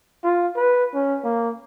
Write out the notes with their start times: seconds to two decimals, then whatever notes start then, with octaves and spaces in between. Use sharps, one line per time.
0.24 F4
0.56 B4
0.94 C#4
1.24 A#3